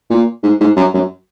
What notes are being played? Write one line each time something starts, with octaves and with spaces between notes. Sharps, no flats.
A#2
G#2
G#2
F#2
F#2